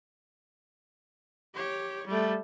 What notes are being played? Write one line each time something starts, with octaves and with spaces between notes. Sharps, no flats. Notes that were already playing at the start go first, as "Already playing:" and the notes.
G4 C#5
G3 A3